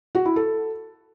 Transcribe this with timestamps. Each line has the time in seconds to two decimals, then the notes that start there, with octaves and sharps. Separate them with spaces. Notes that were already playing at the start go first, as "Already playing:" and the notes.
0.15 F#4
0.25 E4
0.36 A4